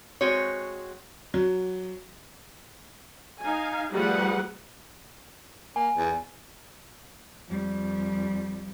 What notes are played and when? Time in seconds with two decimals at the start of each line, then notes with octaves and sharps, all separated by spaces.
0.21 G#3 C4 F#4 C#5
1.34 F#3
3.43 D#4 F5 G#5
3.94 F3 G3 A3 G#4 B4 F#5
5.76 A#3 G#5
5.97 E2
7.48 F2 G3